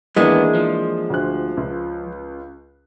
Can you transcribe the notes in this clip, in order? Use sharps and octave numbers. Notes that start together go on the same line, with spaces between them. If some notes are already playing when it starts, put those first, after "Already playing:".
D#3 E3 G#3 A#3 B3 D4
F3
D2 F#6
C#2